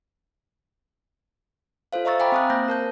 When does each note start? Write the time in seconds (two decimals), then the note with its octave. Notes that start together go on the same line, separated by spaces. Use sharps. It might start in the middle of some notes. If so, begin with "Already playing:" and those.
1.93 F4 A4 C5 F5
2.05 D#5 E5 A#5 C#6 E6 A6
2.19 F5 G5 G#5 A#5 B5 D6
2.32 C4 D#6 F#6
2.50 A#3 C5 G6 A#6
2.68 A#4 A5 G6